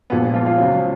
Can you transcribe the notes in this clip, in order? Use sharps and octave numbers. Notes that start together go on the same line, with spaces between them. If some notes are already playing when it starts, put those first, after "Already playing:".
A#1 A#2 F3 G#3 B3
F3 F4
F3 F4
C#2 C#3 F#3